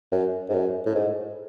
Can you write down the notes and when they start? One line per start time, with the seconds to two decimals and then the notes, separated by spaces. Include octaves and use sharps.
0.12 F#2
0.49 G#2
0.53 F#2
0.86 A2
0.95 G#2